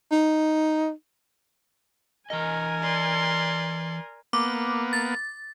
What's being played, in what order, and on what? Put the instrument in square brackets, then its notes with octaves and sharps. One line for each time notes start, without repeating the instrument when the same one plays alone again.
[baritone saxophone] D#4
[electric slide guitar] E3 D#5 [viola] A#4 G#5
[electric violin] D5 C6
[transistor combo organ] A#3 B3 [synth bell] D6
[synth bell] A6